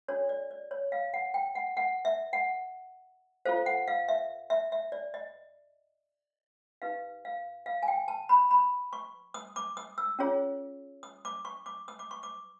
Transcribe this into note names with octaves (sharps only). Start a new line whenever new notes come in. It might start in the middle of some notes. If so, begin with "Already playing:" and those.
D4 F#4 A4 C#5
D5
D5
C#5
F5
F#5
G5
F#5
F#5
E5
F#5
F4 A4 C5 F5
F#5
F5
E5
E5
E5
D5
D#5
D#4 G4 B4 F5
F5
F5
G#5
G5
A5
B5
B5
C#6
D#6
D6
D#6
E6
C#4 F4 G#4 C#5
D#6
D6
C#6
D6
D#6
D6
C#6
D6